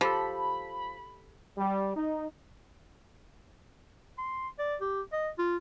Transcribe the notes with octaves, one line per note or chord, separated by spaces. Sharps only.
F3 G4 A4 B5
G3
D#4
C6
D5
G4
D#5
F4